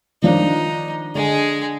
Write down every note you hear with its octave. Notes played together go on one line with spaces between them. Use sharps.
D#3 F3 D4 D#4
D3 G#3 G#4